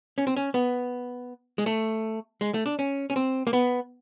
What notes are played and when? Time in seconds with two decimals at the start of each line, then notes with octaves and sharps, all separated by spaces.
0.18 C#4
0.27 C4
0.37 C#4
0.54 B3
1.58 G#3
1.66 A3
2.41 G#3
2.54 A3
2.66 D4
2.79 C#4
3.10 C#4
3.16 C4
3.47 A#3
3.53 B3